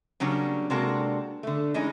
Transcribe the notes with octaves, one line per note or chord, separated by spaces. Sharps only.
C#3 F#3 G3 A#3 D4 C#5
C3 G#3 A#3 D4 F#4 A4
D3 A3
E3 G#3 C#4 D#4